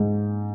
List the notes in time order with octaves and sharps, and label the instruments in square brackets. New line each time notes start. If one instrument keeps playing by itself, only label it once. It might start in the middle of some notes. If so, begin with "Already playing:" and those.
Already playing: [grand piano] G#2